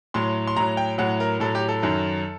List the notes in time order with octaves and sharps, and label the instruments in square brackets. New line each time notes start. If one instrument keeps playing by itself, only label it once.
[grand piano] A2 F#3 C6
C6
A2 F#3 A#5
G5
A2 F#3 F#5
A#4
A2 F#3 A4
G4
A4
F#2 D#3 F#3